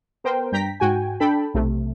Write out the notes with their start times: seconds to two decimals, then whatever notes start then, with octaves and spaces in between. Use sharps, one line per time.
0.24 B3 A#4 C5 G5
0.52 G2 G5 A#5 B6
0.80 G#2 F#4 G5 G#5
1.20 D4 A4 G5 A5 B5
1.54 B1 C3 A3